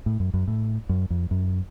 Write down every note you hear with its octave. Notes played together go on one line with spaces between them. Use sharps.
A2
F#2
F#2
A2
F#2
F2
F#2